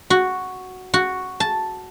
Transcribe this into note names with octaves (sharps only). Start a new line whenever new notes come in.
F#4
F#4
A5